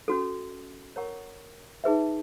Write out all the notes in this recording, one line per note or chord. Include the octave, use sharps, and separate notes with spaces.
C#4 F#4 A4
A#4 C#5 F#5 A#5 C#6
D#4 G#4 B4 E5